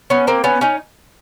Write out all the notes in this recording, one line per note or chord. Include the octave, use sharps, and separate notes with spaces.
B3 C#4
A#3 C4
B3 C#4
C#4 D#4